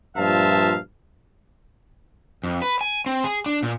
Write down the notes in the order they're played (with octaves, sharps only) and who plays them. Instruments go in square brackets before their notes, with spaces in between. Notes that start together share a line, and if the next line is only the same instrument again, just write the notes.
[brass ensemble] G2 A#2 F3 E5 F5 A5
[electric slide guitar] F2
B4
G#5
C4
G#4
D4
A#2